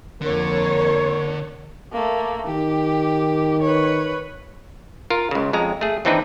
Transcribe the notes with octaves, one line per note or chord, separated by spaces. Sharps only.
F2 D3 A#3 A#4 C#5
A3 A#3
D#3 G4
B4 C#5
F4 A#4
C#2 C#3
F2 G#3 A#5
A3 G#4
D#2 E3 C4 D4 D#4 B4